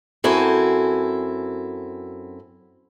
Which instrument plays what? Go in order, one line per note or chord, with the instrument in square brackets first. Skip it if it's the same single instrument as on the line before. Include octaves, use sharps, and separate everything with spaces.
[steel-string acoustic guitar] F#2 C4 E4 F#4 A4 G#5